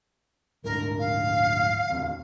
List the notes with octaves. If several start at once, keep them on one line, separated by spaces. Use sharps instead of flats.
D2 G#2 D4 A#4
F5
E1 D2 C4